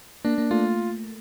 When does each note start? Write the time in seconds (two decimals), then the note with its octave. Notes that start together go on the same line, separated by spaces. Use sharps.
0.24 A#3 D4
0.38 A#3
0.51 A3 F4